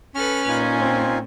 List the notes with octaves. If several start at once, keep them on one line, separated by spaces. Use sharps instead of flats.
C#4 A4 B4 F6
A#2 D#4 F4 G#5
C4